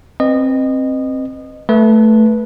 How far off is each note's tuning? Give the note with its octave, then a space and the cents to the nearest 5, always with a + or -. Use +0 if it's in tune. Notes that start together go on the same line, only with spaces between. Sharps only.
C4 +15 B4 +0 D#5 -20
A3 +0 B4 -15